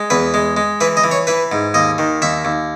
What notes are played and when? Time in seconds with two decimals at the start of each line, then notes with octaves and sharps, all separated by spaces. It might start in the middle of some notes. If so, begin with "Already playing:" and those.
Already playing: G#3
0.10 E2 B4
0.34 G#3
0.57 G#3
0.81 E3 B4
0.97 D#5
1.04 E3
1.11 C#5
1.27 E3 B4
1.52 G#2
1.74 D#2 D#5
1.98 D#3
2.22 D#2 E5
2.45 D#2